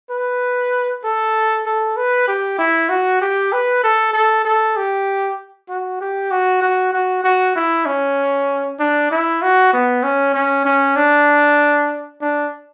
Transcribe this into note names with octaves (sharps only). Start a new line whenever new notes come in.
B4
A4
A4
B4
G4
E4
F#4
G4
B4
A4
A4
A4
G4
F#4
G4
F#4
F#4
F#4
F#4
E4
C#4
D4
E4
F#4
B3
C#4
C#4
C#4
D4
D4